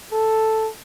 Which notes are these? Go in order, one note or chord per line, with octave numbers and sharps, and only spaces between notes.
A4